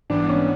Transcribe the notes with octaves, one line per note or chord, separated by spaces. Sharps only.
G#2 E3 G3 B3 D4
C#4